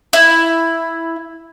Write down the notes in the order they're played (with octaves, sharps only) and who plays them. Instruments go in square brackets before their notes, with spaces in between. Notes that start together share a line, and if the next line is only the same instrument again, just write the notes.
[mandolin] E4